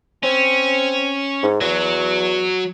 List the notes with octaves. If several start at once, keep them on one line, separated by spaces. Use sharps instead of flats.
C4 C#4
G#2
E2 F#3